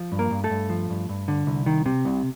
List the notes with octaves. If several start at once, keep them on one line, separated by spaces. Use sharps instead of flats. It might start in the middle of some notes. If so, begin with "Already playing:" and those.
Already playing: F3
G2
A#3 A#4
G2
A3 A4
G2
F3
G2
G2
D3
C2
D#3
C3
C2